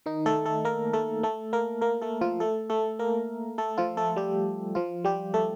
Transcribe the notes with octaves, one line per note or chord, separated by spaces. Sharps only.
D#3 D#4
A3 A4
A3 A4
A#3 A#4
A3 A4
A3 A4
A#3 A#4
A#3 A#4
A3 A4
F3 F4
A3 A4
A3 A4
A#3 A#4
A3 A4
F3 F4
A3 A4
G3 G4
F3 F4
G3 G4
A3 A4